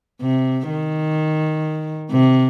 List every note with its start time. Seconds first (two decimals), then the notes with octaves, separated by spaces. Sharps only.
0.22 C3
0.69 D#3
2.11 C3